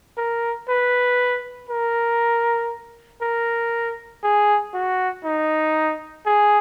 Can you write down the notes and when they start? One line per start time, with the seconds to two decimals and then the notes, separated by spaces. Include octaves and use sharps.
0.17 A#4
0.69 B4
1.69 A#4
3.22 A#4
4.23 G#4
4.74 F#4
5.25 D#4
6.26 G#4